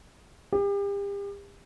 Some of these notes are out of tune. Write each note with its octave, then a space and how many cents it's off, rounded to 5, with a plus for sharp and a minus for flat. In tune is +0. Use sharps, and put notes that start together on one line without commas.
G4 +40